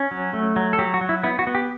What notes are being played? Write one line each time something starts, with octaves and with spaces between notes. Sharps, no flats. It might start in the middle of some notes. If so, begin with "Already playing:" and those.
Already playing: C#4
F#3
A3
F#3
A4
F#3 G4
F#4
F#3
E4
B3 E4
F#4
B3
G4